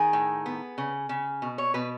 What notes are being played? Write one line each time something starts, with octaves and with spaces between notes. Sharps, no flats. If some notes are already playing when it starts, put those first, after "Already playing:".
Already playing: D#3 G#4
A2
B3
C#3
C#3
B2
C#5
B2 B4